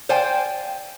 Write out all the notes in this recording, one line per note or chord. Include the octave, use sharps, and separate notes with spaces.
C5 D5 F5 G5 G#5